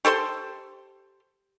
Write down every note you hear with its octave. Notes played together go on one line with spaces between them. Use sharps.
G4 A4 C5 C6